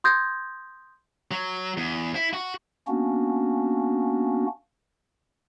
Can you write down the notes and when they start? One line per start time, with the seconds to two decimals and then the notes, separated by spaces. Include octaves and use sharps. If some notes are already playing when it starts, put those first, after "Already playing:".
0.04 C6 D#6 G6 G#6 A#6
1.31 F#3
1.77 E2
2.15 E4
2.33 F#4
2.87 A#3 B3 C#4 D4 F#4